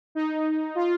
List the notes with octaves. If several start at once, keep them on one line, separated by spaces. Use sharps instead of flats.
D#4
F4